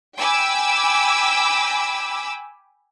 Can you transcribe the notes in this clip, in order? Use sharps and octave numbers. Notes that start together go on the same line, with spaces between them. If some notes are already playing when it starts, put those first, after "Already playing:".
G5 G#5 B5 D6 E6